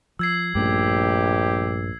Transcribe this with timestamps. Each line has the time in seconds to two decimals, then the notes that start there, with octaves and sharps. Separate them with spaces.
0.19 F3 E6 G#6 C7
0.55 A#1 G2 A3 C#4 G4